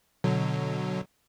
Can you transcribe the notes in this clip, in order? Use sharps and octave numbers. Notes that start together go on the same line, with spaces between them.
B2 D3 F#3